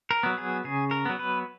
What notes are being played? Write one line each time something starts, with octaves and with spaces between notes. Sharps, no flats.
A#4
F#3 B3
G#4
C#3 G#4
A#4
F#3 B3
B4